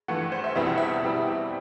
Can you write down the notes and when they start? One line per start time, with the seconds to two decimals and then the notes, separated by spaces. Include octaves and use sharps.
0.08 G2 E3 A3 F#5
0.32 C5
0.44 E5
0.55 E2 B2 G3 C4 E4 E5
0.67 F#5
0.78 E5
1.02 B2 G3 C4 E4